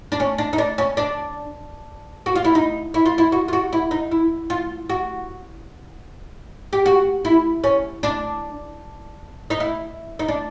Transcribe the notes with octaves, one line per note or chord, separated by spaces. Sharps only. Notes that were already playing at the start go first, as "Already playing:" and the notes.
D4
C#4
D4
D#4
D4
C#4
D4
F#4
F4
E4
D#4
E4
F4
E4
F#4
F4
F#4
E4
D#4
E4
F4
F#4
G4
F#4
E4
C#4
D4
D#4
E4
D#4
D4